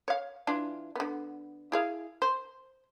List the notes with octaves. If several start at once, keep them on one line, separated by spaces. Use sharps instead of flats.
C#5 F5
E3 D4 F4
D3 B3
E4 G#4 F5
C5